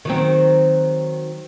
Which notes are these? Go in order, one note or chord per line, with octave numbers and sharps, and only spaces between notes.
D#3 F#3 C4